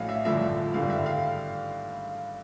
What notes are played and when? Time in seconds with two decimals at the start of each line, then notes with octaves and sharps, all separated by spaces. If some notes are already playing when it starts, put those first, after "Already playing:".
Already playing: A#1 A2 F#3 D#5 F5
0.09 E5
0.25 A1 G2 D3 F3 E5
0.74 G#1 G2 D3 G3 F5
0.90 E5
1.06 F5